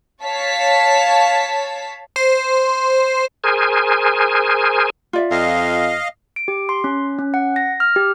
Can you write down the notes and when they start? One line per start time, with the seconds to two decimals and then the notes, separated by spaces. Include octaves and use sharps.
0.24 C#5 F5 A5 B6
2.16 C5
3.44 G#4 A#4 C5 G#5
5.13 F4 D5 E5
5.31 F2 D#5 F5
6.36 D7
6.48 G4
6.69 C6
6.84 C#4
7.19 C#4
7.34 F#5
7.56 A#6
7.80 F6
7.96 G4